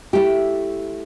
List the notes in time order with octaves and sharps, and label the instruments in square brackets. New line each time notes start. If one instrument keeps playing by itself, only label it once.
[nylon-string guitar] A3 E4 G4